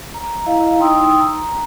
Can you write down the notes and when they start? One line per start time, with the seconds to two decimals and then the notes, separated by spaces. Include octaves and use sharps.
0.14 A#5
0.46 E4 D#5 F5 A#5
0.78 D#4 G5 C6 D#6 E6
1.20 A#5